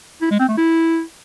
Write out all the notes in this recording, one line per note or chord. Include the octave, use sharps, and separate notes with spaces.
E4
G#3
C4
A3
E4